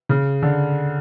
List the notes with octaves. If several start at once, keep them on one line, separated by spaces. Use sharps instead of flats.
C#3
D3